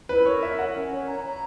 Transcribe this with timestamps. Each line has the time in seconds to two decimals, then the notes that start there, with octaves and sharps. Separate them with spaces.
0.09 E4 B4
0.26 A#4 C#5
0.43 C#5 E5
0.58 A#4 F#5
0.75 C#4
0.91 C#5
1.07 A#5
1.24 A#5